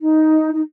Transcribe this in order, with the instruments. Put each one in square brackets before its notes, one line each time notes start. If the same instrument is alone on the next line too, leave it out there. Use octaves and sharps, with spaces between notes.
[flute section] D#4
D#4